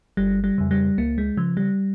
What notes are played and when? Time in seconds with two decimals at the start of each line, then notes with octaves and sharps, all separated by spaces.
0.17 G1 G3
0.44 G3
0.58 F2 C#3
0.71 G3
0.98 C#2 A#3
1.18 G#3
1.37 C#3 F3
1.57 G3